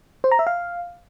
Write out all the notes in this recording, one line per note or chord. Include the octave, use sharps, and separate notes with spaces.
C5
A#5
E5
F5